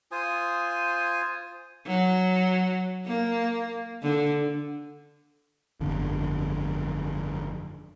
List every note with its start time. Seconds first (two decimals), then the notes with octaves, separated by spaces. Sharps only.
0.12 F4 C5 G#5 D#6
1.87 F#3
3.06 A#3
4.03 D3
5.81 G1 F2 D3